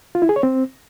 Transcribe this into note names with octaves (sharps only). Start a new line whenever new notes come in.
F4
E4
G#4
C#5
C4